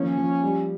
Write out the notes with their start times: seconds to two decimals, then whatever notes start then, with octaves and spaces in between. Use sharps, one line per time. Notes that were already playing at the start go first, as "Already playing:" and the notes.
Already playing: D#3 F3 A#3 C#4
0.18 F3
0.43 G3